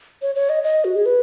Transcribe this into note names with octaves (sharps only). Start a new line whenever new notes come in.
C#5
C#5
D#5
D#5
F#4
G#4
B4